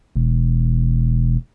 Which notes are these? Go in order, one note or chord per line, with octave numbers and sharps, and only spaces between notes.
E1